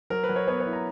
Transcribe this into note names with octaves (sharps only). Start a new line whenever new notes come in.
F#3 A#4
B4
F#3
C#5
B3 C#5
C#5
E4
A#5